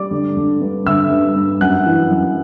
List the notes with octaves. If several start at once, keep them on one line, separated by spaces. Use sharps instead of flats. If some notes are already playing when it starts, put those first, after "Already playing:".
Already playing: G3 D5 D6
D3
D3
G2
D3 E5 E6
G2
G2
F#2 F#5 F#6
E3
F#2